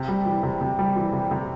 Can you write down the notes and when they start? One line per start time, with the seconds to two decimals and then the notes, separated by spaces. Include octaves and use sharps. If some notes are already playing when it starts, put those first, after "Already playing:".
Already playing: C3
0.08 G3
0.26 E3
0.43 C3
0.61 C3
0.79 G3
0.96 E3
1.13 C3
1.31 C3